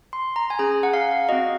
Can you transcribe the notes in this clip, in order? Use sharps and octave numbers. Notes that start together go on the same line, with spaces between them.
C6
A#5
G#5
C#4 G#4 A#5
F#5
F5
C4 F#4 D#5